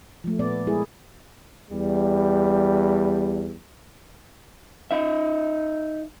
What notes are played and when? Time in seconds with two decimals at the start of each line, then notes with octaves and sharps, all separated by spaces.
0.24 F3 A3
0.39 A#2 B3 D5
0.67 G#3 E4 G#4 A#4
1.71 E2 G3
4.91 D#4 E5